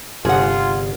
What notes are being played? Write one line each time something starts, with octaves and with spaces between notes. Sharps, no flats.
G1 G2 C3 F4 G#4 F#5